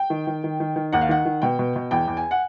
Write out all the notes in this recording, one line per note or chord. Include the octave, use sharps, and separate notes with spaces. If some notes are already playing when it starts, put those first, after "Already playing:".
Already playing: G5
D#3
D#3
D#3
D#3
D#3
D#2 F#5
F5
D#3 F#5
D#3
B2 G5
B2
B2
E2 G5
E2
G#5
F#5